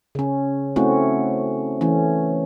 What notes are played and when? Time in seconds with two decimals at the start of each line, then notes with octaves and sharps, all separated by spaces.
0.15 C#3 C#4
0.76 A3 C4 C#4 E4 F#4
1.81 E3 A3 C#4